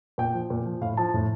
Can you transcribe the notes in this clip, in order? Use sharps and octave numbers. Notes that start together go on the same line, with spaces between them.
A#2 G5
F3
A#2
F3
A2 F5
F3 A5
A2